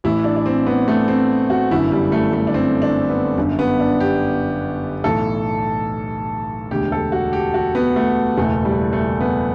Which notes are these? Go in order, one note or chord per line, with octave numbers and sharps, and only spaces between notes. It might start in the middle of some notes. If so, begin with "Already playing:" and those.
A1 A2 E3 E4
D4
D4
C4
B3
A3
C4
F#4
G1 F#2 D3 E4
G3
A3
A3
D4
C4
D4
B3
G1 F#2 D3
B3
D4
G4
B1 A2 E3 A4
E1 D2 D3 G4
A4
F#4
G4
F#4
B3
A3
F#1 E2 B2 A3
G3
A3
B3